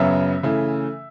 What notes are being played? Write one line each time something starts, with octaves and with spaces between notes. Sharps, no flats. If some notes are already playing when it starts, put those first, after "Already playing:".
Already playing: F#2 C#3 F#3 B3 E5
C#3 E3 A3